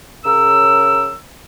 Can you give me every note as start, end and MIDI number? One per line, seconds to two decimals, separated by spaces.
0.25 1.14 49
0.25 1.14 70
0.25 1.14 88